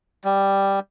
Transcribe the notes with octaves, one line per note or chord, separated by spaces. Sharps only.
G3